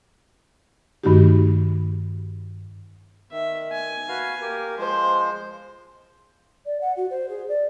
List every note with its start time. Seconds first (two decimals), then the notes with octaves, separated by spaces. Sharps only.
1.04 G2 D#3 A3 D#4 F#4 G4
3.31 D#3 E5
3.72 G#5
4.08 F#4 B4 F5
4.41 A#3 G4 A#4
4.78 F3 G#3 C5
6.65 D5
6.80 F#5
6.96 F#4
7.10 C5
7.28 G#4
7.48 D5